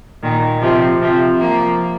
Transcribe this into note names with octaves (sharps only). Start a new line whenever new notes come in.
A#2 D#3
C3 F3
C3 F3
F3 A#3